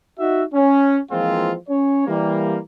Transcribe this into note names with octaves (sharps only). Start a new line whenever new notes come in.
D#4 F#4 E5
C#4
E3 F3 G#3 A#3 C4 F4
C#4 C#5
E3 G3 A#3